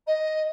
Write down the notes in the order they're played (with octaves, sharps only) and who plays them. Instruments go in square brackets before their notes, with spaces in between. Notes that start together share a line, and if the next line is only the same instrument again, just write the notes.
[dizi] D#5